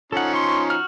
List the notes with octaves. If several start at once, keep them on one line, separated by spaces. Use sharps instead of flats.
F3 C#4 D#4 A4 F#5
C6 C#6
F#4 F6